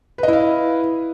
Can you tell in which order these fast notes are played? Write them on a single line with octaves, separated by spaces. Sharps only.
B4 D#5 E4 F5